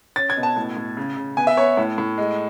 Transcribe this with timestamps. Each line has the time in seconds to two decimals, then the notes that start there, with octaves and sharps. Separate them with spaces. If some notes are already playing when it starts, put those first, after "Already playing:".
0.16 C#4 A6
0.30 G#6
0.37 B2
0.43 A5
0.56 A2
0.77 A2
0.97 C#3
1.17 C#3
1.37 B3 G#5
1.47 E5
1.57 B3 C#5
1.77 A2
1.98 A2
2.18 G#3